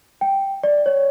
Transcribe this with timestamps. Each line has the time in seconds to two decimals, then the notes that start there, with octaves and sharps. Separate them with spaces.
0.21 G5
0.64 D5
0.86 C#5